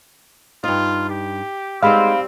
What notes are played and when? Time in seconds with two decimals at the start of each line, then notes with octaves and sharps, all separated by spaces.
0.64 G2 D#4 F4
1.09 G4
1.83 G3 G#3 B3 C4 D#4 F5 B5